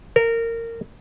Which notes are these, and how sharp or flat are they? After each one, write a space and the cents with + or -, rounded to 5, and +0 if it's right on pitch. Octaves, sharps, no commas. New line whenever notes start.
A#4 -20